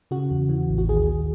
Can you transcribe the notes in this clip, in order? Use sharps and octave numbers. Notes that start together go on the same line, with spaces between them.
C#3 F#4
E2
E3
A1
F#4
D#2 G#4
D#2